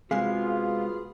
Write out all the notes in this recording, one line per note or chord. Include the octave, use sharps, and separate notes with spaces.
C3 G#3 B3 F4 F#4 G#4 F5